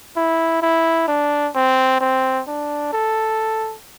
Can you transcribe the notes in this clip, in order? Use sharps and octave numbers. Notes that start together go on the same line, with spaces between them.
E4
E4
D4
C4
C4
D4
A4